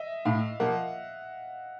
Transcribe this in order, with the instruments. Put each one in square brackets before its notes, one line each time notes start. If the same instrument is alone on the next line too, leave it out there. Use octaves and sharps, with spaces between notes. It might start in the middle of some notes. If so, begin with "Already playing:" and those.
Already playing: [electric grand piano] D#5 E5
[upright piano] A2 [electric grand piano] F5
[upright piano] F3 A#3 [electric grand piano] F#5